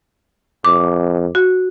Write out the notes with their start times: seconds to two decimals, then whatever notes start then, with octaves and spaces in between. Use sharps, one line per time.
0.65 F2 D6
1.35 F#4